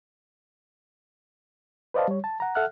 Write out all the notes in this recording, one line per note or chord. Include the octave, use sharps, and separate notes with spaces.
B4 C5 D5 D#5 F5 A5
G3 C#5
A5
F#5 A#5
A4 E5 F#5 F6 F#6